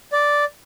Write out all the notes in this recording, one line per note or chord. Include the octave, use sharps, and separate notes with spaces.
D5